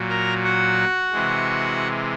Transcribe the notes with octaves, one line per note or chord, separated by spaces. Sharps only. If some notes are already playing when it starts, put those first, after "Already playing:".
Already playing: A#2 F#3
A#4 A#5
F#4 F#5
C3 E3 G#3